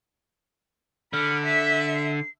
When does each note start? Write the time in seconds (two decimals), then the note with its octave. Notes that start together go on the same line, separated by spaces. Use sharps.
1.13 D3 B5 F6
1.46 E5 B6
1.95 C7